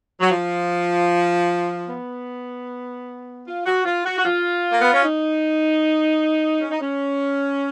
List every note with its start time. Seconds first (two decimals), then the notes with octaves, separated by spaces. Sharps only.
0.20 F#3
0.31 F3
1.88 B3
3.45 F4
3.65 F#4
3.85 F4
4.05 F#4
4.17 F#4
4.24 F4
4.71 A#3
4.82 B3
4.93 C#4
5.03 D#4
6.60 C#4
6.70 D#4
6.81 C#4